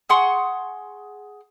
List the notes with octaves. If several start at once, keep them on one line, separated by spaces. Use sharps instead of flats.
G#4 F#5 C6 C#6